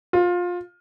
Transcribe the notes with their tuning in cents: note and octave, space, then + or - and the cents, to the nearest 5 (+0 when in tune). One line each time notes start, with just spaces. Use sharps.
F4 +20